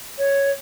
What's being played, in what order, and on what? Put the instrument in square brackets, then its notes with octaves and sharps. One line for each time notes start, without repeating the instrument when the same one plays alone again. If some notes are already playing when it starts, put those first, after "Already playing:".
[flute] C#5